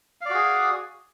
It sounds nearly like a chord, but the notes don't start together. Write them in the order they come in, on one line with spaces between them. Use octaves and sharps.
F5 D5 F#4 G#4